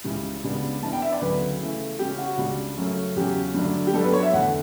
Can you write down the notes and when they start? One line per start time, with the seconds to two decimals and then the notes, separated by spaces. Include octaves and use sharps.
0.04 C#2 C#3 E3 G3
0.44 C#2 C#3 G3 B3 D4
0.83 G2 E3 B3 D4 A5
0.93 G5
1.02 E5
1.12 D5
1.21 D2 C#3 F#3 B3 B4
1.61 C#3 E3 A3
1.99 C#3 G3 C#4 G4
2.18 F#4
2.38 C#2 C#3 G3 D4
2.77 F#2 C#3 F#3 A3 C#4
3.16 E2 C#3 F#3 C#4 G4
3.54 G2 D3 F#3 A3 D4
3.87 G4
3.93 G2 F#3 B3 D4 A4
4.04 B4
4.13 C#5
4.23 E5
4.33 E2 D3 A3 F#5